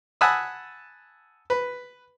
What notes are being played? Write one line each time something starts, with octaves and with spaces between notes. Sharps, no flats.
F#5 G#5 A5 B5 D#6 E6
B4